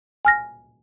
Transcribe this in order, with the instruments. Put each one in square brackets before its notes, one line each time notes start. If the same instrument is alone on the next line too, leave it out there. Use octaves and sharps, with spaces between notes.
[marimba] G#5 F6 A#6